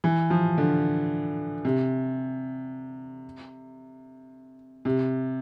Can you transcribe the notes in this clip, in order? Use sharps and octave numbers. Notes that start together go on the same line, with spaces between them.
E3
F3
D3
C3
C3